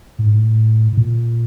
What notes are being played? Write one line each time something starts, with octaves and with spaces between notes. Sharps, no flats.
A2
G#2
A2
A2
A#2